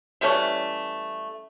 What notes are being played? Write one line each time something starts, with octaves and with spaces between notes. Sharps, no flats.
E3 G3 A3 C#4